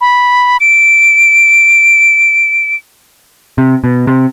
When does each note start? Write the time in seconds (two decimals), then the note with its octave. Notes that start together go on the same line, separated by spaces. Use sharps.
0.01 B5
0.60 D7
3.58 C3
3.84 B2
4.07 C3